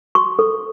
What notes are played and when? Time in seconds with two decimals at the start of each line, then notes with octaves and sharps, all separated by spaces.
0.15 F#4 C#6
0.39 A4